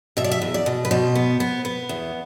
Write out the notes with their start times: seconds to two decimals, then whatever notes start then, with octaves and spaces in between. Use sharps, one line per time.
0.17 B2 E5
0.24 D5
0.31 E5
0.42 E2
0.54 D5
0.66 B2
0.85 B4
0.91 B2 C5
1.15 B3
1.40 B3
1.65 B3
1.89 E2